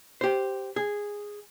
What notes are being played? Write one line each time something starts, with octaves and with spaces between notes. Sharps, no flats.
G4 C5
G#4